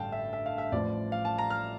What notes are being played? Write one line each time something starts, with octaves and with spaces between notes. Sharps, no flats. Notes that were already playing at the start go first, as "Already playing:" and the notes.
Already playing: A1 G2 D3 F5 G5 A5
E5
E5
F5
E5
A1 A2 F3 D5
F5
A5
A#5
F6